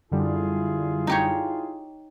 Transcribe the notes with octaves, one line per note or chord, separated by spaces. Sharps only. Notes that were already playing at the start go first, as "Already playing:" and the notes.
F#2 D3 G3 E4 F4 G#4
D#4 G4 C#5